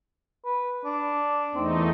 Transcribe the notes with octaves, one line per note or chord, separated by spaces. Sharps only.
B4
D4
E2 A3 C4 D#4